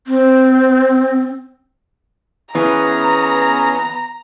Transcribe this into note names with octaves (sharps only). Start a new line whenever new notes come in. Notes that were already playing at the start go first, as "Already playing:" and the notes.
C4
E3 B3 C#4 G#4 A#5